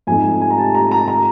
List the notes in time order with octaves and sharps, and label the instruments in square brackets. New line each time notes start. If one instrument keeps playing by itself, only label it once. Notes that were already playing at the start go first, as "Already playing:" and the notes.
[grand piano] G#2 F3 A3 C4 D#4 [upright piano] G#5
[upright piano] G#5
A#5
A5
A#5
A#5
A#5